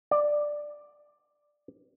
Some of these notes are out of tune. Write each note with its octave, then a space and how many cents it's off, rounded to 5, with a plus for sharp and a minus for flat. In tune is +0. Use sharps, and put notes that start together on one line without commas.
D5 +10